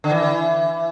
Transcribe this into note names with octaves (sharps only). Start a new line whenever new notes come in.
D3
E3